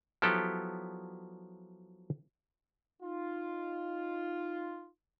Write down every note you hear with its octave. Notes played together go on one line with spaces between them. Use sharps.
F3 F#3 B3 E4 G4 A4
D#4 F4